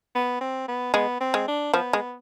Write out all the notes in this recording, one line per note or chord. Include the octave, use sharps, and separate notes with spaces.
B3
C4
B3
G#3 B3
C4
G#3
D4
F3 B3
G#3